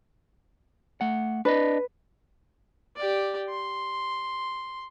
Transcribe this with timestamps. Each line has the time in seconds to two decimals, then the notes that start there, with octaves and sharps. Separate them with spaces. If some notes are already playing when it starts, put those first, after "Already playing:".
1.01 A3 F#5
1.45 D4 B4 D5 D#5
2.96 G4 D5
3.50 C6